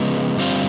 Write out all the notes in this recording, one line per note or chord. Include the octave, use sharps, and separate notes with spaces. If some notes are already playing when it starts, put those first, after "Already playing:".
Already playing: C#3 F3 G#3 B3
G2 D3 G3 C4 F4